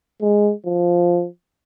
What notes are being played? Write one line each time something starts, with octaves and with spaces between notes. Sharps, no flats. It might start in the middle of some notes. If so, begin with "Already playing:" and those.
G#3
F3